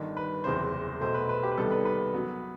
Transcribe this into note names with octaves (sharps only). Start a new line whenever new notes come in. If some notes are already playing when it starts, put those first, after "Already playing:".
Already playing: G1 G2 D#3
B4
F#1 E2 C3 E3 C5
B1 B2 A3 C5
B4
B4
G4
B4
C2 C3 D#3 G3 B3 A4
B4
B4
F#2 F#3 B3